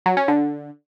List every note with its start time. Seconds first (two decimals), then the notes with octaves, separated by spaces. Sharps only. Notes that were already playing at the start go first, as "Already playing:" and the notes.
0.06 F#3
0.17 C#4
0.28 D3